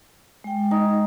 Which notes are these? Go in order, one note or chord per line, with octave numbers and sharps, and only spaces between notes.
G#3 G5
D#4